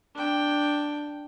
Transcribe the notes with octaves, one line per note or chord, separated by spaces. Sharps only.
D4 G5